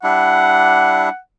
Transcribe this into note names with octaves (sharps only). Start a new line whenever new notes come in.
G3 D4 E4 F#5